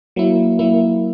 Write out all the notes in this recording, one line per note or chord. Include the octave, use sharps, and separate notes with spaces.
F#3 A#3 E4
F#3 A#3 E4